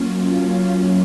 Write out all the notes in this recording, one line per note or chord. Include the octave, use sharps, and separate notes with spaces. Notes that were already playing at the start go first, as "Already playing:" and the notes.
Already playing: F#3 A#3 C#4 F4